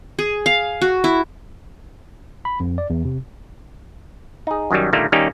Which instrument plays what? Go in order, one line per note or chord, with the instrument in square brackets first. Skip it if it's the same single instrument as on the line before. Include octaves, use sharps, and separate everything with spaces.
[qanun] G#4
F5
F#4
E4
[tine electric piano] B5
F2
D5
E2
C3
[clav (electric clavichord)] D#4 G#4
F#2 D#3 F#3 G3
A#2 D3 D#3 G3 A3 A#3
D#3 G3 A#3 C#4 D#4 G4